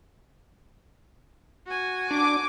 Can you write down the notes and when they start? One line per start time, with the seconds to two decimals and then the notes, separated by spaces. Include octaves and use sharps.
1.66 F#4 G#5
2.11 D4 D6